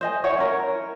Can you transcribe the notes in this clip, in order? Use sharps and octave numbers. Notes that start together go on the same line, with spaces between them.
C5 D#5 G#5
E4 C#5 F#5
C#4 A#4